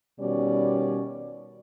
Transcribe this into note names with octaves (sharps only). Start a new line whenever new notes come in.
B2 D#3 G3 C#4 D5